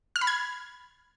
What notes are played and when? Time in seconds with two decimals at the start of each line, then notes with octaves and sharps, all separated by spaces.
0.16 F6
0.21 B5
0.27 G#6